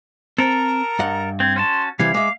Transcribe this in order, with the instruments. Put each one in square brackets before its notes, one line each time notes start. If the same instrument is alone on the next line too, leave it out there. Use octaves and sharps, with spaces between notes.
[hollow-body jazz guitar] C4 [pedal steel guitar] A4 A#4 [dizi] A#5
[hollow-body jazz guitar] G2 D#5 F#5
[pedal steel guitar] C4 [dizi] G#6
[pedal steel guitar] C#4 F#4 A5 [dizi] C6
[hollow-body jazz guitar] C3 E3 G3 [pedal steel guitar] F5 [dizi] G#6
[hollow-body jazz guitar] G#3 E5 [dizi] D6